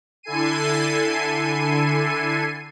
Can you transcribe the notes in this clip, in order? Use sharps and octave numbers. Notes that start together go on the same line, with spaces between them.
D3 E4 A4 G#5 C7 D#7